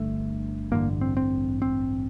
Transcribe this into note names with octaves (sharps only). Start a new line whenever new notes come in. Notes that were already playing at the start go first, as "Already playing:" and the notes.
Already playing: G1 G2 D3 A3
A1 G2 D3 A#3
C4
C4
C4